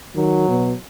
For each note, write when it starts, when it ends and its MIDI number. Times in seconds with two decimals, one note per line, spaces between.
0.16 0.48 51
0.16 0.81 54
0.48 0.73 47